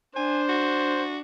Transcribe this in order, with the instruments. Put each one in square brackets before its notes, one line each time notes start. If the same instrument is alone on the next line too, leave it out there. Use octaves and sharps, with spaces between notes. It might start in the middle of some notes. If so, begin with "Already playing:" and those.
[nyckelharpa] D4 [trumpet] C5 [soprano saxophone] G#5
[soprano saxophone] F#4